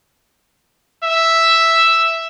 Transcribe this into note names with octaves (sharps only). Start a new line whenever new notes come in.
E5